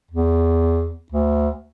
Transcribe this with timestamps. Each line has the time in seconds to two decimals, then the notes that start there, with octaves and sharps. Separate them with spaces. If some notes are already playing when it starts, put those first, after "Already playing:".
0.11 E2
1.12 D2